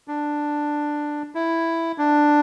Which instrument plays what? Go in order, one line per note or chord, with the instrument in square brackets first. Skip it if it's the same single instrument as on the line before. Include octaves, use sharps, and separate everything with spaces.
[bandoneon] D4
E4
D4